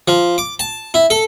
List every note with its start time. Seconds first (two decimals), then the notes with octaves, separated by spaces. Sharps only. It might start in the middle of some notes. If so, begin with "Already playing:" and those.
0.08 F3
0.38 D6
0.59 A5
0.94 E4
1.10 A4